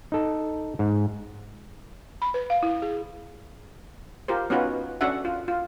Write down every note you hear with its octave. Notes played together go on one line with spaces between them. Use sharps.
D#4 A4
G#2
B5
B4
F5
E4
G#4
F4 G4 A#4 C5
B3 C#4 D#4 F4 F#4 B4
C#4 D4 F#4 A4 E5 F#5
F4
F4